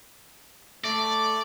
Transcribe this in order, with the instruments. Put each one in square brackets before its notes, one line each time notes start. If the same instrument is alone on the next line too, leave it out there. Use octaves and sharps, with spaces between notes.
[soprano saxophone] A3 [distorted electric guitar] D5